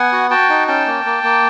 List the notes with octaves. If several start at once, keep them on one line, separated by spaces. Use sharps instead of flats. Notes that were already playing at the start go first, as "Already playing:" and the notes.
Already playing: B3 F#5 G#5
F#4
F#4 G5 A5
D#4
C#4 G5 A5
A#3
A#3
A#3